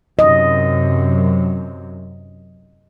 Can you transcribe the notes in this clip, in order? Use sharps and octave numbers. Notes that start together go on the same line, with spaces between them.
F#2 C3 D#5